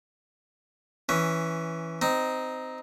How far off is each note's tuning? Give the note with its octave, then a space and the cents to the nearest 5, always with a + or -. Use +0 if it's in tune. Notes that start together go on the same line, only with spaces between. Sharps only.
E3 +0 C#4 +0
C4 -15 D#4 +0